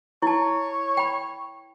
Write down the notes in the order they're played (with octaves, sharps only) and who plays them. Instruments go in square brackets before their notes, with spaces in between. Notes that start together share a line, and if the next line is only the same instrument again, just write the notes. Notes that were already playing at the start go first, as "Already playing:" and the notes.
[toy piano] E4 A5 [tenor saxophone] C#5
[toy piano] G5 B5